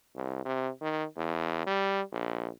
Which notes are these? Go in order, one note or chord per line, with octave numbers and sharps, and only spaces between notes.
C2
C3
D#3
E2
G3
A#1